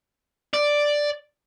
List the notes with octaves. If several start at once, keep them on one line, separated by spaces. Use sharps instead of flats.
D5